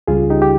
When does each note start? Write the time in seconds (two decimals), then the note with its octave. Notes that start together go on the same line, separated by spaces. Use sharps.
0.08 C#2 C#3 G3 F4 G#4
0.30 D#4 G4
0.42 G4